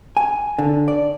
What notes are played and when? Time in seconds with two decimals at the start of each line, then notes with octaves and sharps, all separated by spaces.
0.17 G#5
0.59 D3
0.88 D5